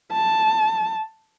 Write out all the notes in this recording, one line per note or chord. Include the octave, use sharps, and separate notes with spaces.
A5